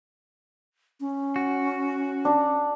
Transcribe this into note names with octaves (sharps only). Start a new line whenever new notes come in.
C#4
F#4
D4